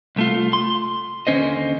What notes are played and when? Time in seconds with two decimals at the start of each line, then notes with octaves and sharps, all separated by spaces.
0.16 C2 A3 F4
0.53 C6
1.27 D#2 D3 C#4 C5 D#5